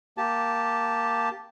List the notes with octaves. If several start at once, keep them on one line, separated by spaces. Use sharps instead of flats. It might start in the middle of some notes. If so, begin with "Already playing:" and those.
A#3 G4 A5